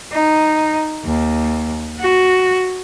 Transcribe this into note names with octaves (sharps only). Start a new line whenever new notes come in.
D#4
D#2
F#4